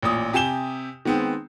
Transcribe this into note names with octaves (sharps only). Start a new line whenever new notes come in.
A1 A#2 D#6
C3 G4 G#5 E7 G7
D#3 G#3 B3 C4